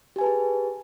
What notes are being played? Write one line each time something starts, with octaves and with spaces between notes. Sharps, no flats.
G4 G#4 B4 G#5 A5